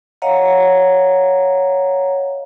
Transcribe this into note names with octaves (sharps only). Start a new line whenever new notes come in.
C#5 D#5 F5 F#5 A#5